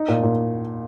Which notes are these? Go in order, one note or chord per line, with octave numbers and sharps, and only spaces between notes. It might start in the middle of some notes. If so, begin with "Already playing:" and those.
Already playing: D#4
A#2
A#2